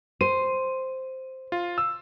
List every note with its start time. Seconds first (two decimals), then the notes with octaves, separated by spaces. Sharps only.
0.21 C5 D#7
1.52 F4
1.78 E6